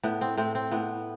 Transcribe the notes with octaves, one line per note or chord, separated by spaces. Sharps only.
A2 B3
C4
A2 C4
C4
A2 B3